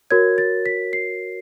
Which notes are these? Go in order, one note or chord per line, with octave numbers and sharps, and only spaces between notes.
F#4 A#4 C#5 G#6
A6
B6
C7